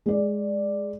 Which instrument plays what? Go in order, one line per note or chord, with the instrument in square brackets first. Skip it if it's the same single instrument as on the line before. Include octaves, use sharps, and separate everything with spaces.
[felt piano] G#3 D5